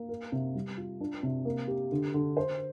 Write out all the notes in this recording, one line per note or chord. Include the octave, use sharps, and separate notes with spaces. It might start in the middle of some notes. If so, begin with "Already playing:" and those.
Already playing: A#3
A#4
C3
G3
F4
D4
C3
A#3
G4
D3
D3
C5